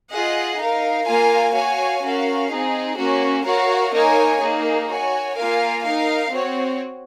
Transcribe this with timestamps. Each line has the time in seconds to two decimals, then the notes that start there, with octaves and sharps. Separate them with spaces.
0.10 F4 G#4 D#5 F#5
0.58 D#4 A#4 F5
1.06 A#3 F4 A#4 F5 G#5
1.54 F#4 C#5 F5 G#5
2.01 C#4 F#4 A#4 F5
2.49 C4 D#4 G#4
2.97 A#3 C#4 F#4
3.44 F#4 A#4 C#5 F5
3.92 A#3 D#4 A#4 C#5 G#5
4.41 A#3 D#4 G#4
4.89 F#4 C#5 G#5
5.36 A#3 F4 A#4 F5 G#5
5.84 D#4 A#4 F5
6.32 C4 F#4 C#5